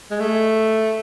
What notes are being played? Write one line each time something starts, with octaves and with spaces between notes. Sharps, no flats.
G#3
A3